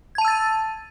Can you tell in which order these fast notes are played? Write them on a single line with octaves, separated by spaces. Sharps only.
G#6 A5 D#7 E6 A6